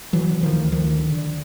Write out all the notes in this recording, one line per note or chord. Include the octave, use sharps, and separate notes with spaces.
D3 E3 F#3
D3
D#3 F3
D2
D2 D#3 F3
D3
D3